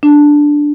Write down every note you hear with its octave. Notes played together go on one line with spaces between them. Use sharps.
D4